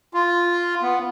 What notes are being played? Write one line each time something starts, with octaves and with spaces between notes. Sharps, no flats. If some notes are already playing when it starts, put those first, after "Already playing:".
F4
B3